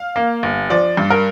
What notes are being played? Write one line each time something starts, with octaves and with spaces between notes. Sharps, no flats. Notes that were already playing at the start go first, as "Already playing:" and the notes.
Already playing: F5
A#3
G1
F3 D5
G2
A#4